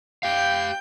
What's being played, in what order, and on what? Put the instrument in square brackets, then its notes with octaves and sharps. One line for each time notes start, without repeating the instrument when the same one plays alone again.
[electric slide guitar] G4 F5 [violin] G5 G6